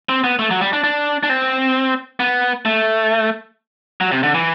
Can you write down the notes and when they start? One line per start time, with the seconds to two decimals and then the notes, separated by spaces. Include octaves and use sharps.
0.09 C4
0.24 B3
0.39 A3
0.51 F#3
0.61 G3
0.73 D4
0.84 D4
1.23 D4
1.30 C4
2.20 B3
2.65 A3
4.01 F#3
4.12 C3
4.23 D3
4.34 E3